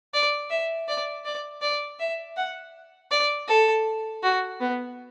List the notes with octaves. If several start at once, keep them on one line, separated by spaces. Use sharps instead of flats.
D5
E5
D5
D5
D5
E5
F#5
D5
A4
F#4
B3